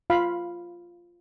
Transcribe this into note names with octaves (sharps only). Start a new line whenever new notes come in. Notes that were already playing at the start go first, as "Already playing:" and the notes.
F4 F5 B5